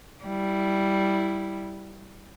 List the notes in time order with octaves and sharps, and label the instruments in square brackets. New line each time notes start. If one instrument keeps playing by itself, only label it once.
[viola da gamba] G3 E4